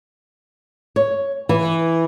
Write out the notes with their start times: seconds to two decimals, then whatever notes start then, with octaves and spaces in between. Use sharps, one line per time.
0.96 C#5
1.49 E3